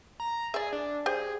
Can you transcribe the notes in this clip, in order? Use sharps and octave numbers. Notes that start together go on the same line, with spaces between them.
A#5
G#4 D5 E5
D4
G4 G#4 C5